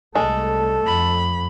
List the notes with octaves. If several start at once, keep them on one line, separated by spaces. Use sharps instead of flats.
C2 G#3 A3 A4
F2 B5